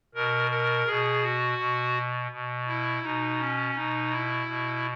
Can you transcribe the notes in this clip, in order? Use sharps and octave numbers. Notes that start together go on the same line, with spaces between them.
B2 A#4
A#4
B2 G#4
F#4
B2
B2
E4
B2 D#4
C#4
B2 D#4
E4
B2